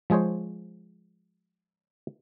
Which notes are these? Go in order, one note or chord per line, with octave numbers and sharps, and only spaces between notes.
F3 G#3 G#4 C5 C#5